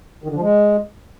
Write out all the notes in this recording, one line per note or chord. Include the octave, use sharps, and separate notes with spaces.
D#3
D3
F3
G#3